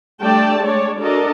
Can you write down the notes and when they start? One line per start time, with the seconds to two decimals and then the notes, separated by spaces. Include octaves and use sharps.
0.22 G3 A3 D4 D5 G5 A5
0.60 G#3 D4 C#5 D5
0.99 D4 F#4 A4 A#4 D5 D#5